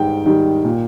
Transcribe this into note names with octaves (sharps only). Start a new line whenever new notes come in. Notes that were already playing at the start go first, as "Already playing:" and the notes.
Already playing: G#2 D#3 G3 G5
D#3 G3
A#2